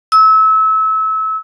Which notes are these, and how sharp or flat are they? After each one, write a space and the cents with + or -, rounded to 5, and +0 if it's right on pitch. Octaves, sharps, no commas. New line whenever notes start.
E6 -30